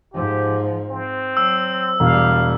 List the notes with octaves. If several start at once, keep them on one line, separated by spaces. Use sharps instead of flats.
G#2 F3 G4
C4
F#3 E6
E1 G3 F5